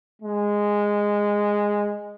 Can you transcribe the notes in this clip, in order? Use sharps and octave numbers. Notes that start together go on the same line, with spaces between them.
G#3